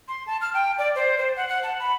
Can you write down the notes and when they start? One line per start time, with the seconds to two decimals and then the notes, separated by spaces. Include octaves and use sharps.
0.08 C6
0.27 A5
0.41 F6
0.54 G5
0.78 D5
0.95 C5
1.18 C5
1.36 F#5
1.49 F#5
1.63 A5
1.80 B5